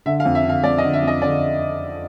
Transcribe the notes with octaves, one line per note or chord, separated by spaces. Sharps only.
D3 E5
F5
F2
E5
D3 F5
F2 D5
D#5
D3
E5
F2 D#5
D3 D5